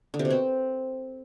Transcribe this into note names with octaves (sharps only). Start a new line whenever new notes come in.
D3
C3
B2
C4